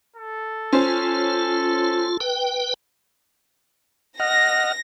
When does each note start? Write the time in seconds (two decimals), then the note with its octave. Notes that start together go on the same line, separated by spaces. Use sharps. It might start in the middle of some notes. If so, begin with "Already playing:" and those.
0.16 A4
0.73 C#4 F4 C5
2.20 B4 G5
4.20 D#5 F#5 F6 A#6